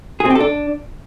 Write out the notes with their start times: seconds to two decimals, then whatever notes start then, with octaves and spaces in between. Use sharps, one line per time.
0.20 G#4
0.25 C4
0.30 G4
0.35 A4
0.40 D4